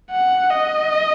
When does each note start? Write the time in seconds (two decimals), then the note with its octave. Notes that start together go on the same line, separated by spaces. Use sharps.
0.11 F#5
0.51 D#5